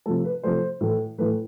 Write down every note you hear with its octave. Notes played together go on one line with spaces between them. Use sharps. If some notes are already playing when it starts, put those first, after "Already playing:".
C3 F3 A3 A4
B4
C3 F3 A3 C5
A2 E3 A3
A2 E3 A3 B4